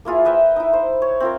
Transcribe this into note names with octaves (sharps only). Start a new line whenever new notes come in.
A#3 E4 F4 G#4
B4 D#5 E5 G5
D#4 E4
C5
C#5
C4 F4 A#4